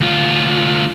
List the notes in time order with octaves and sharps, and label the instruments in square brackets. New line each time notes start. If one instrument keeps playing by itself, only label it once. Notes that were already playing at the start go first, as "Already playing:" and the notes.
[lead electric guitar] D2 F4